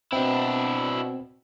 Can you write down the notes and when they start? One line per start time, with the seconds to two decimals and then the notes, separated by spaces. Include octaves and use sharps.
0.13 B2 C4 D4 E4